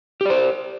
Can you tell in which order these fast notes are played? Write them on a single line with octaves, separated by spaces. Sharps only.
G4 D5 C5